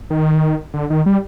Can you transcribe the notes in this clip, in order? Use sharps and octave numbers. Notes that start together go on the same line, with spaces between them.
D#3
D3
D#3
G3